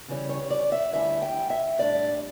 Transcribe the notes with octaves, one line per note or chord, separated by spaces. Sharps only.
C#3 E3 G3 C#4
C#5
D5
E5
D2 D3 G3 C#4 E4 E5
G5
E5
A2 G3 D4 D5